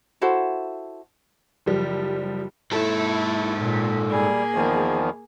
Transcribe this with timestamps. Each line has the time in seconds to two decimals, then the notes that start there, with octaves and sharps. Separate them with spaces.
0.21 E4 F#4 A4 C5
1.66 F#1 F3 G3
2.72 G#2 E4 A4
3.57 A#2
4.10 G3 A#3 G#4
4.55 E2 D#3 F3